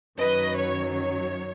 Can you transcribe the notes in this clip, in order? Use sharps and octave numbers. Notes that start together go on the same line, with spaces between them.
F#2 D#3 F#3 B4 D#5
C#5
C#5